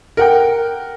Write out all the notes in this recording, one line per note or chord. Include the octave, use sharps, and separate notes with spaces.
A#4 F#5 G5